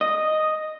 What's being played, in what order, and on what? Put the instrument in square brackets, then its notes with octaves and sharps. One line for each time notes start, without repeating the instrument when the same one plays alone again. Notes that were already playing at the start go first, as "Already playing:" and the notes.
[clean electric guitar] D#5